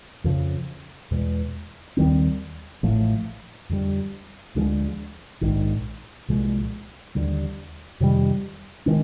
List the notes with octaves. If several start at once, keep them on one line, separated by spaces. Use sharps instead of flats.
F2 C#3 F3
E2 B2 G#3
D#2 D#3 G3 C4
A1 A2 F3 A3
F2 D3 G3
D2 D3 F3 G#3
A#1 G#2 D#3
C2 A#2 F3 G#3
D#2 D3 G3
F2 C3 D#3 G3
D#3 G#3 C#4